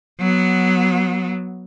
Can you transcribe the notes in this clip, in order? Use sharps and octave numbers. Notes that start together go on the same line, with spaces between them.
F#3 B3